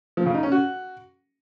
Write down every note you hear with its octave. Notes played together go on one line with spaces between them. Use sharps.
F3
C#3
D#4
C#4
F#4